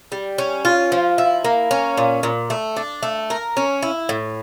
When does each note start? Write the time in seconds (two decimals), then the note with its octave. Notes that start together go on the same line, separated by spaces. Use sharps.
0.12 G3
0.38 C#4
0.65 F4
0.92 F3
1.18 E4
1.45 A#3
1.71 C#4
1.97 A#2
2.23 A#2
2.50 A3
2.77 D4
3.03 A3
3.30 A#4
3.57 C#4
3.83 E4
4.09 A2